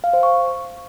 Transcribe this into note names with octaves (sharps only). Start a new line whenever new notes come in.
F5
C5
C#6